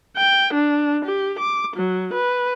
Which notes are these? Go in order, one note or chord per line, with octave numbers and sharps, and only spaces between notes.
G5
D4
G4
D6
F#3
B4